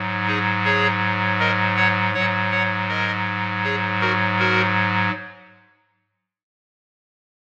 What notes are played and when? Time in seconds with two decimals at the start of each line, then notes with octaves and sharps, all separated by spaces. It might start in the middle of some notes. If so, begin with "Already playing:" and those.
Already playing: G#2 F#3
0.27 D#4 G#4
0.64 G#4 C#5
1.40 A#4 D#5
1.77 C#5 F#5
2.14 G#2 F#3 C#5 F#5
2.52 C#5 F#5
2.89 A#4 D#5
3.64 G#4 C#5
4.01 F#4 A#4
4.39 F#4 A#4